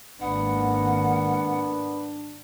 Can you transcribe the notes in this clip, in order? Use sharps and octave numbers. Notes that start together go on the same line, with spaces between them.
G#1 A#3 B3 D4 F#5